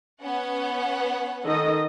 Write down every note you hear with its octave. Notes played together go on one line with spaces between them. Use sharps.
B3 C#4 F#5
D#3 A4 D#5